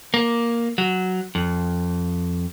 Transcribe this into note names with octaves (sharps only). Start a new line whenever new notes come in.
A#3
F#3
F2